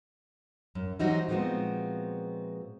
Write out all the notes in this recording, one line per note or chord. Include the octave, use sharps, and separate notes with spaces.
F#2
E3 F#3 G3 D#4 F#4 C5
A#2 F3 G#3 B3 C4 F#4